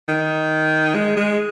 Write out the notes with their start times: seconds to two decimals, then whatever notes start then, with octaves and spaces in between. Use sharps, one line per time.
0.08 D#3
0.95 G#3
1.17 G#3